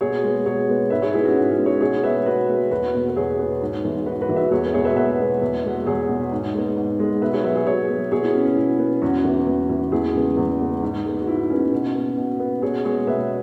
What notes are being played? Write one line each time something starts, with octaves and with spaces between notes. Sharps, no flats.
B2 G#4 C#5
G#3 B3
B2 G#4 C#5
G#3 B3
G#2 B4 E5
G#4 C#5
G#3 B3 E4 G#4
C#4 F#4
G#2 E4
C#4
G#3 B3
G#4 C#5
B2 G#4 C#5
G#3 B3 B4 E5
B2 F#4 B4
G#3 B3
E2 F#4 B4
B2 B3
B4
E2 G#4 C#5
B2 B3
G#2
E3 G#3 B3
G#2 F#4 B4
F#4 B4
E3 G#3 B3
B4 E5
E2 G#4 C#5
B4
B2 G#3 B3 G#4 C#5
B4 E5
E2 B4 E5
B2 G#3 B3
E2
B2 G#3
E2 G#4 C#5
B2 G#3
G#2
G#3 B3
G#2
G#3 B3
B2 B4 E5
G#4 C#5
F#3 B3 B4 E5
G#4 C#5
B2 G#4 C#5
F#3 B3
B2 G#4 C#5
E4
B3 C#4
C#4
B2 E4
B3
E2 C#4 F#4
E3 B3
E2
E3 B3
E2 E4 G#4
C#3 G#3 B3
E2
C#3 G#3 B3
G#2
G#3 B3
F#4
G#2 E4
G#3 B3 C#4
B2
B3
B2
B3
B2 G#4 C#5
G#3 B3 G#4 C#5
B2 B4 E5